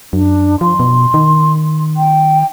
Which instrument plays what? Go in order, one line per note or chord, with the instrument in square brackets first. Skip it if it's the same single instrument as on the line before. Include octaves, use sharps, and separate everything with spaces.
[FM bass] F#2 [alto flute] D4
[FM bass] F3 [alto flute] C6
[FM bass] B2
D#3
[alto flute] G5